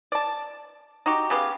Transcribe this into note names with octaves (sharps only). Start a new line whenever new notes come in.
D5 A5
D#4 F#4 G4
C#3 B3 G4 F5